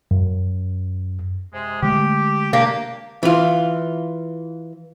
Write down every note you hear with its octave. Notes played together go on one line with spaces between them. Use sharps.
F#2
C3 G#3
D3 G#3 A3 G4
A#3 D4 G4
E3 F4